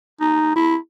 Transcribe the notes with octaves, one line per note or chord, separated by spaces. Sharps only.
D#4
E4